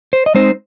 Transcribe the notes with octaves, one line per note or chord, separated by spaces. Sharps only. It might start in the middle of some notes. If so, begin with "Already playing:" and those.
C5
D#5
G#3 C4 D#4 C5